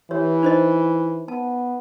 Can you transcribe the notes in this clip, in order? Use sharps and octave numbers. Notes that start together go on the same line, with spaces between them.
E3 G4 C#5
D#4 C5 D#5
B3 A5